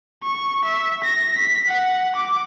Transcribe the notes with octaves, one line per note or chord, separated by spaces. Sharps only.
C#6
E5
A#6
B6
F#5
D6